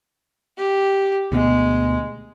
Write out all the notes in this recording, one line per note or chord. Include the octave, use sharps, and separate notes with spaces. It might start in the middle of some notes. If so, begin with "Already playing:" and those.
G4
D2 B2 G#3 B3